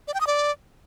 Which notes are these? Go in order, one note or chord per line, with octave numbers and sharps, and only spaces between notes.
D5
G5
D#6
D5